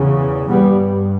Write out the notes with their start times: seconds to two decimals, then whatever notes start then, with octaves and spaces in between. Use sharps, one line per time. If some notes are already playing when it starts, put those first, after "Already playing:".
Already playing: E2 C#3
0.50 G2 G3 B3